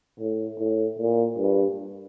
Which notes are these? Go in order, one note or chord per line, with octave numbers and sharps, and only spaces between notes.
A2
A2
A#2
G2